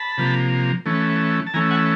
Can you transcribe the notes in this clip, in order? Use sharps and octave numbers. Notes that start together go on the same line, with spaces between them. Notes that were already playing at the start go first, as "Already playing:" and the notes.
Already playing: A5 B5
C3 F3 A#3
E3 A3 C#4
A5
E3 A3 C#4 G#5 A#5
F#5 G#5